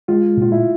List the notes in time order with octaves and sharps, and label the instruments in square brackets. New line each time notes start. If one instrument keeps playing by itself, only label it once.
[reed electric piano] G#3 [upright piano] F4
[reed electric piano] A#2 [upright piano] F4
[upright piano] E4